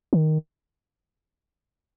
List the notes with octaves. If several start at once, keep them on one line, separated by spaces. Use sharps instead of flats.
D#3